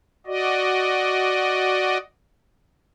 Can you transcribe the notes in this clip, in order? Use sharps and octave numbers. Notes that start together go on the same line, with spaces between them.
F#4 D5 D#5